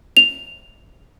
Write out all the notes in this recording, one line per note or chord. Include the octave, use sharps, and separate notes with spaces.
F7